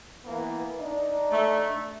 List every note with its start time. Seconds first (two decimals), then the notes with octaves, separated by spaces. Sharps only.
0.24 E3 A#3 B3
0.79 D4 D#4
1.31 A3